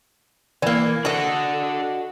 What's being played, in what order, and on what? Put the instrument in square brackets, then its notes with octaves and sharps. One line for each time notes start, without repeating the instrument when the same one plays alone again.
[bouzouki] E3 A#3 [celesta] D5
[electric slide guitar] D4 A4 [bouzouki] F#4 D#5